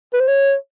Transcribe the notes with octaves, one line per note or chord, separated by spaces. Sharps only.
B4
C5
C#5